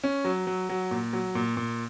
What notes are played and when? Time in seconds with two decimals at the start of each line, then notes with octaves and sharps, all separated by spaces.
0.04 C#4
0.24 F#3
0.47 F#3
0.69 F#3
0.91 A#2
1.13 F#3
1.35 A#2
1.57 A#2